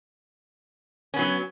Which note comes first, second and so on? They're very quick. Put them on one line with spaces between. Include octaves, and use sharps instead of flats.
C#4 B3 F#3